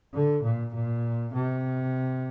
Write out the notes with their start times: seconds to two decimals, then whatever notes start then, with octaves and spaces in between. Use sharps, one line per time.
0.14 D3
0.43 A#2
0.74 A#2
1.34 C3